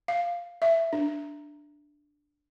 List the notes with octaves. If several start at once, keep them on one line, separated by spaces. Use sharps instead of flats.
F5
E5
D4